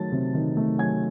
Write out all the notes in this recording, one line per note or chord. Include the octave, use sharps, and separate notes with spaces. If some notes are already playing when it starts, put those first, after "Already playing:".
Already playing: D#3 F#3 A3 A5 A6
C3
D#3
A3
F#3 G#5 G#6